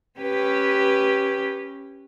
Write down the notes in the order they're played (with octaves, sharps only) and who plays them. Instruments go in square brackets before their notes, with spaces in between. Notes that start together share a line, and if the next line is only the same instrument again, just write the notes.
[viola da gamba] C#4 G4 B4